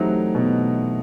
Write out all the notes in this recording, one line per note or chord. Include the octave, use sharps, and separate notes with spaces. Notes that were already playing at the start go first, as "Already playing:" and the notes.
Already playing: E3 F#3 A3 C4 D#4 E4 G4
B2